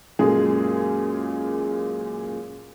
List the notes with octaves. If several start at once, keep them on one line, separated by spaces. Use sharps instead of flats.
F#2 A#2 G#3 G#4 A4